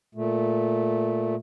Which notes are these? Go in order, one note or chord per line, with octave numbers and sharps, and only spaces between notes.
A#2 A3